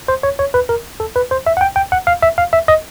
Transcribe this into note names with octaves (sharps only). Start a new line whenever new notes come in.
C5
C#5
C#5
B4
A#4
A4
B4
C5
E5
F#5
G5
G5
F#5
F5
E5
F5
E5
D#5